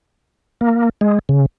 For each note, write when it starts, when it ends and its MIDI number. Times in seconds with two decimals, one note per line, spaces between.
0.61 0.89 58
1.01 1.19 56
1.29 1.46 49